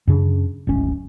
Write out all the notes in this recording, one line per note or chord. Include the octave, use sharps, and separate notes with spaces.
F#2 C#3 D4
D1 G#1 C#4